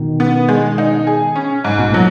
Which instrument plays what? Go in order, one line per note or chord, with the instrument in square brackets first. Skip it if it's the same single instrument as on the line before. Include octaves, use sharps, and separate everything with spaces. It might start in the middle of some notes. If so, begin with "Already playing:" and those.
Already playing: [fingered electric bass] B2 D#3
[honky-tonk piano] B3
G#3
D#4
G#4
C#4
G#2
[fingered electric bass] B2
[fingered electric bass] A#2 [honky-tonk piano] F#3